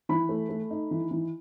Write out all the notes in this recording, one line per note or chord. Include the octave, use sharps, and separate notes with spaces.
E3 B5
A3
A3
D#4
E3
E3